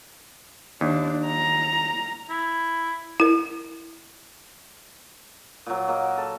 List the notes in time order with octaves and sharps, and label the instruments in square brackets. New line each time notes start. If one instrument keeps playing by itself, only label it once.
[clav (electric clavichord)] D#2 [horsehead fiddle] D4
[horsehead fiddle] A#5
[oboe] E4
[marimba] E4 A#4
[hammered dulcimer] A#2 F#3
F#3 A#3 D#5
A4